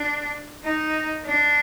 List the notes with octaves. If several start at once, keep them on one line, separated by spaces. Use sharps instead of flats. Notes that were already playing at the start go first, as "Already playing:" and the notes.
Already playing: D4
D#4
D4